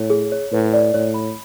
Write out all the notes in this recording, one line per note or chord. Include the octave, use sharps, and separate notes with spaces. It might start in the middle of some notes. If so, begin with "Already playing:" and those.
Already playing: A2 C#5
G#4
C#5
A2 B4
D5
A2 C#5
B5